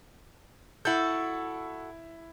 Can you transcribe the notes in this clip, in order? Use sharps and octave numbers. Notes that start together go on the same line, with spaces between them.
E4 F#4 A4 G6